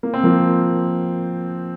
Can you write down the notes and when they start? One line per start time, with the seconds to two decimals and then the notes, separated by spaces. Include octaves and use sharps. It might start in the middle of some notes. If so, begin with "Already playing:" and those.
0.03 A#3
0.14 C4
0.23 F3 A#3